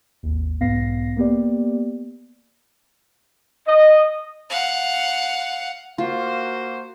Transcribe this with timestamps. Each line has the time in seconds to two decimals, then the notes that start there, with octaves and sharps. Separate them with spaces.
0.23 G#1 D#2
0.60 B1 G#2 B3 F5 A#6 C7
1.16 A#3 B3 G4 D5
3.67 D#5
4.50 F5 F#5
5.98 A#3 F4 F#4 C5